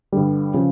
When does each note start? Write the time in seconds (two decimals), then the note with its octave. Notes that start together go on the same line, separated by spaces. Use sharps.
0.12 G2 D3 G3
0.54 C#3 F3